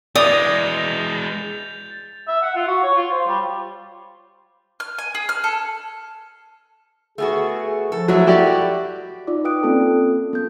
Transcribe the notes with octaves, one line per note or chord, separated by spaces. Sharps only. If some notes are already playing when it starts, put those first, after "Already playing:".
E3 G#3 D5 D#6 G6 A6 F7
E5
F#5
F4
F#4
C#5
F4
C5
G3
F6
G#5
G#4
F6
A4
A3 B3 F#4 G#4
F3 A4
F#3 G#3 A3 E4
F#4 G4 D5
D#4 F4 D5 D6
B4 F5 G5 D#6 F#6 D7
A#3 C4 C#4 F4 A4 A5
B3 A4 G6